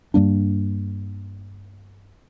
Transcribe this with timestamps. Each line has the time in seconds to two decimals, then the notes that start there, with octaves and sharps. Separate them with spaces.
0.14 G2 G3 A#3 D4